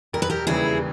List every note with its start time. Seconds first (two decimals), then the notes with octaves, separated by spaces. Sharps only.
0.13 E1 A#4
0.22 B4
0.30 G4 A#4
0.47 D#2 C#3 E3 G3 E4 G#4